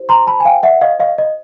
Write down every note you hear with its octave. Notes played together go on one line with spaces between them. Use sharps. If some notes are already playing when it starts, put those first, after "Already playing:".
Already playing: E4 G4 C5
A#5 C6
A5 B5
G#5
F5 G5
E5 F#5
D#5 F5
D#5 F5
D#5